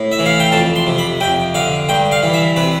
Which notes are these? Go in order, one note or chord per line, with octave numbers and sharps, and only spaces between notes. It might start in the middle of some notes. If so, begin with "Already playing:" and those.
Already playing: A2
E5
E3
F5
G5
F2 A5
C6
C3
B5
F2 G5
D3 F5
G2 G5
F5
E3
E5
C3 B4